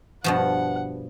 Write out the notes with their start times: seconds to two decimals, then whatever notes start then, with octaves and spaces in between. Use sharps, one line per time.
0.24 G2 B2 F3 F#5